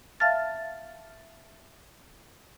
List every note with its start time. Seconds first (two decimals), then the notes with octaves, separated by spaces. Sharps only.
0.20 E5 F5 A5 F6 A6